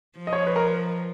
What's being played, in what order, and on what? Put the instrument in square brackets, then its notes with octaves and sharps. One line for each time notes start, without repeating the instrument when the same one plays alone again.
[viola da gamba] F3
[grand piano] D#5
C#5
B4
A#4